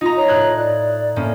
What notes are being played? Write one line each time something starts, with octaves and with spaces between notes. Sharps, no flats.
D#4 F4 A#5
C#5
A2 F#6 G#6
D5
A2 A#3 C#4